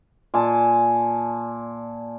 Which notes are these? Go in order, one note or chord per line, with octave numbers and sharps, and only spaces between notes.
A#2 G#5 A5